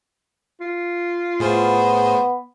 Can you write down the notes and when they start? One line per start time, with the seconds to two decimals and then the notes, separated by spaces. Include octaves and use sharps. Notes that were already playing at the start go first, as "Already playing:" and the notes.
0.61 F4
1.40 A2 B3 G#4 C5